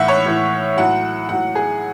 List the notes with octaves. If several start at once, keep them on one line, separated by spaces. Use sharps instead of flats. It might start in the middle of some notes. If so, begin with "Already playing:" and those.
Already playing: A2 E3 E5 F#5
C#5
A2 E3
A2 F#3 F#5
A2 F#3 F#5
G#4